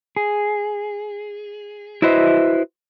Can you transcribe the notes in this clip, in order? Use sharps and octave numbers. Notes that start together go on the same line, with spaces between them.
G#4
E4 F#4 B4 C5 D#5 E5